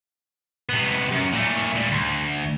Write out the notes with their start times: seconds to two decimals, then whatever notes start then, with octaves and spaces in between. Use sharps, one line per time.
0.69 C3 B3
1.12 F#2
1.33 A#2 A3
1.75 A#2 G3
1.92 D2